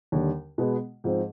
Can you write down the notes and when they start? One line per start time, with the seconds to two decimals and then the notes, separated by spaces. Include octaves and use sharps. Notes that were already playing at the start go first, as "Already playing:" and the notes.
0.12 D#2 D3 G3
0.58 B2 G#3 B3
1.04 G#2 F3 C4